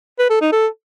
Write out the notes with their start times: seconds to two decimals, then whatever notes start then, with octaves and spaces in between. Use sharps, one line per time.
0.19 B4
0.30 A4
0.41 D#4
0.52 A4